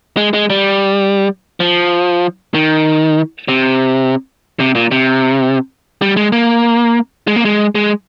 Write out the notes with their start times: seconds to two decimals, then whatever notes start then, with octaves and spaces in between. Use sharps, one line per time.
0.17 G#3
0.34 G#3
0.50 G3
1.60 F3
2.54 D#3
3.48 C3
4.60 C3
4.75 A#2
4.91 C3
6.02 G3
6.17 G#3
6.32 A#3
7.27 G#3
7.36 A#3
7.45 G#3
7.75 G#3